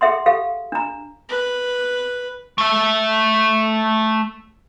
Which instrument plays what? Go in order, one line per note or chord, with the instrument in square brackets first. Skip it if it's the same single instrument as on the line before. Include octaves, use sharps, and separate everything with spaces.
[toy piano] G#4 A4 E5 F#5 C6
G4 A4 F5
D4 A#5
[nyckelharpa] B4
[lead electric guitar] A3 E5